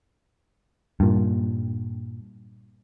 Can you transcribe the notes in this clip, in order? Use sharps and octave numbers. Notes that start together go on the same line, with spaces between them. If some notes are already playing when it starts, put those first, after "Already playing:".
G2 A#2